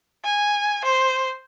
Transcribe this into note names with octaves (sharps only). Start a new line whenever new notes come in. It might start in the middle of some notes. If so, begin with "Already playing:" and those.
G#5
C5